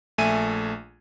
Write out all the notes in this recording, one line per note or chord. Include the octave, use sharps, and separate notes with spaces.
A#1 A3 E5 G#5 D#7